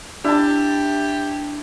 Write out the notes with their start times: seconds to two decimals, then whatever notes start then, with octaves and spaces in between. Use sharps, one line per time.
0.25 D4 E4 G4 A5